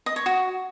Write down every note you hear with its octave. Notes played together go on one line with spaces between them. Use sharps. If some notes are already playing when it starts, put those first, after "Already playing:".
D#5
C#5
F#4